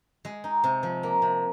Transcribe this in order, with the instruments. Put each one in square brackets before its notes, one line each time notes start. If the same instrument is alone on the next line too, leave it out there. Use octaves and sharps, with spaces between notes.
[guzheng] G#3
D#4
C3
F3
A#3
C3